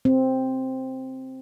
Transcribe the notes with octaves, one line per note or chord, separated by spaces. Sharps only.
C4